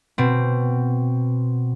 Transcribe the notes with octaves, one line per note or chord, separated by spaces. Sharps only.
B2 C4